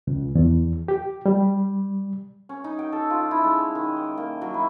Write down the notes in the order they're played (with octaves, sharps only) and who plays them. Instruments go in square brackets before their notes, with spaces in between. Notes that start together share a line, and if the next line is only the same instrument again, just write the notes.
[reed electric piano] C#2
E2
G4
G3
[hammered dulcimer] C#4
D#4
G5
A4
F4
E4
G#3
D#3
G5
A#3
F#3
E4